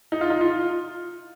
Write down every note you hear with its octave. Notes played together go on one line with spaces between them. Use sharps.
D#4
F4
D#4
F4